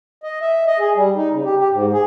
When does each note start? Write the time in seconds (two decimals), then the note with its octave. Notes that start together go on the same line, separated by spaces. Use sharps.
0.23 D#5
0.41 E5
0.67 D#5
0.79 G#4
0.96 G3
1.16 D#4
1.32 C#3
1.45 G4
1.60 G4
1.71 G#2
1.93 G#4